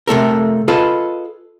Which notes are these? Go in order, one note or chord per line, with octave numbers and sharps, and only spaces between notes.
C3 A3 A4 A#4
F4 G#4 A4 B4 D#5